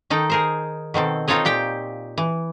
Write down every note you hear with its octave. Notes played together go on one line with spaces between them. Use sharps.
D#3 D#4 A4 G5
G#4 A#4 C5
B2 D#3 C4 A4
C4 D#4 F4 A4 C#5 D#5
A#2 G4 G5
E3